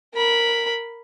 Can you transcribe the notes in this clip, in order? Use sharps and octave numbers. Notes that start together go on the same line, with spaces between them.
A#4 B5